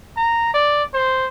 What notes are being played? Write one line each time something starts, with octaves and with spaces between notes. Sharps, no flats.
A#5
D5
C5